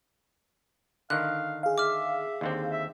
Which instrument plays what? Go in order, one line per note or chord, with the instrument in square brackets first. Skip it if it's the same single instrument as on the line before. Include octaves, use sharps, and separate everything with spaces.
[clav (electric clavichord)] D3 D#3 [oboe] F5 [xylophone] F#6
[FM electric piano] G#4 F5
[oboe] E5 [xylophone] D6 F6
[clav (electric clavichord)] D#2 D3 C4
[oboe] E5